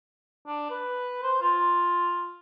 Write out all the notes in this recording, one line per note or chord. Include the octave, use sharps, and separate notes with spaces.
D4
B4
C5
F4